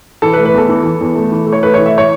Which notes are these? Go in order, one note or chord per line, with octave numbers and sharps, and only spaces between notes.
E3 A4
B4
A3
B4
E2 A4
E3
E3
E2
A3
E3
A3
C#5
A3 B4
E3 C#5
E5
C#5